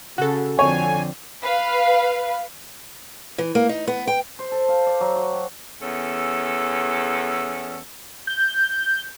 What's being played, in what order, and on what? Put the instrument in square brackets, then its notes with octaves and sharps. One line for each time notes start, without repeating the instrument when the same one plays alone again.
[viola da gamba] C#3 [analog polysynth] F#4 A4
[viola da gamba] F2 D3 C4 [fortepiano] C#5 [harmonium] G#5
[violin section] B4 F5
[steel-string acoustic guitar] E3
A#3
D#4
B3
G5
[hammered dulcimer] C5
A4
F5
D5
F#3
F#4
G5
[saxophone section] E2 C#4 A4
[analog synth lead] G6